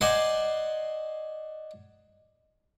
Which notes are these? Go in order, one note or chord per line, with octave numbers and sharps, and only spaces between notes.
C5 D5 D#5 F#5 G#5 C6